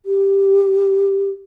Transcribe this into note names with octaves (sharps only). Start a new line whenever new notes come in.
G4